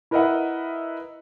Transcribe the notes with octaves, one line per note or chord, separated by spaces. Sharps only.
E4 A#4 B4 D#5 E5 F#5